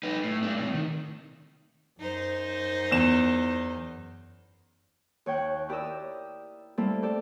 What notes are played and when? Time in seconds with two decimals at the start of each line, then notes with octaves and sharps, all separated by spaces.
0.03 D#4 B4
0.24 A2
0.42 G#2 D4
0.58 A2 C3
0.74 D#3
1.99 F#2 D#4 C5
2.91 E2 E7
5.26 D#2 C#5 G5 F#6
5.69 E4 G4 A#4 D5 D#6 E6
6.77 G3 A3 A#3 C4 E4 A4
7.03 G4 A4 D5